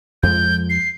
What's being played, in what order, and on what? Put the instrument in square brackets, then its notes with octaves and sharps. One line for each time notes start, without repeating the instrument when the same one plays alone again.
[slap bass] F2 F3 G#3 [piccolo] G6
[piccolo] C7